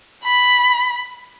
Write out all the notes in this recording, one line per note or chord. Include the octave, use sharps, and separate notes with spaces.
B5